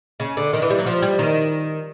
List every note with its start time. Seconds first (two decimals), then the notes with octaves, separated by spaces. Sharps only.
0.20 C#3
0.37 D3
0.53 D#3
0.62 E3
0.70 G3
0.78 F#3
0.86 F3
1.02 G3
1.19 D#3